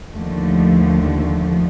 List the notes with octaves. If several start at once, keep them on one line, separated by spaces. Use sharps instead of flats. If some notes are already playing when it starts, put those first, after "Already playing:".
D#2 D3 F3 A3